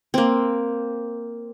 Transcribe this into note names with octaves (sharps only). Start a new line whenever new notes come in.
A#3 C4